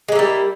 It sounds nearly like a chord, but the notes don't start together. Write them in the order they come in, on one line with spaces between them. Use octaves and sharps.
G#3 A#3 E4 G3